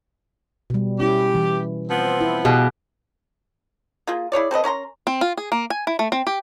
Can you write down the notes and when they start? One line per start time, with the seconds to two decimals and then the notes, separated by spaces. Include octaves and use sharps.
0.70 B2 G3
1.00 C#4 E4 G4
1.35 E3
1.88 F3 B3 C4
2.21 E4
2.45 B2 G4 G#4 F5
4.07 A#3 F4 G#4
4.32 E4 G#4 C#5 D5
4.51 C4 A4 B4 D#5
4.64 C#4 A#4 A#5 C6
5.07 C4
5.21 F4
5.37 G#4
5.52 A#3
5.70 G#5
5.87 E4
5.99 A3
6.12 C4
6.27 G4